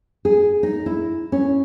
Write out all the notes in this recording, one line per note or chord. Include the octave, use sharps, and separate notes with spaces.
G#4
D#4
E4
C#4